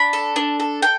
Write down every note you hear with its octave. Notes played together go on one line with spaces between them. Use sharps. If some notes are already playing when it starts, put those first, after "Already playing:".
Already playing: D4 B5
A4
D4
A4
A4 G5